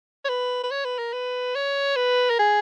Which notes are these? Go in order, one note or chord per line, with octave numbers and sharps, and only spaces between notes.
C#5
B4
B4
C#5
B4
A#4
B4
C#5
B4
A#4
G#4